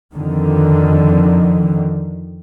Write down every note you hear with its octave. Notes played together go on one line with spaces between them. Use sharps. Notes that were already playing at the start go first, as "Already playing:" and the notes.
F2 D3 D#3